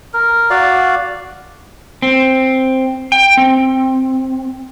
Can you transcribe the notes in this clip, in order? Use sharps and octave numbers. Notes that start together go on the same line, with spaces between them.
A#4
F#4 D5 F5
C4
G5
C4